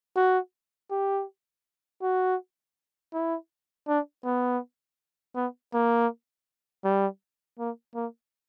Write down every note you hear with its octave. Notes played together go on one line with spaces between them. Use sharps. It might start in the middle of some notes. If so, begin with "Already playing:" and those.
F#4
G4
F#4
E4
D4
B3
B3
A#3
G3
A#3
A#3